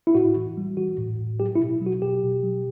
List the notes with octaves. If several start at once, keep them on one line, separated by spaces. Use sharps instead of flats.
E4
A2 F#4
E3
G3
E3 F#4
A2
A2
F#3 G4
E4
B2
F#3
F#4
B2 G4
B2
F#3